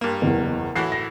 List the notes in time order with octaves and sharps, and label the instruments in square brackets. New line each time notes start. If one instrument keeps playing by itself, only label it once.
[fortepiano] G2 A#3
[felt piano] F#1 E2
[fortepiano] A2 E3 F#4 [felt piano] C7
[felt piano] A#6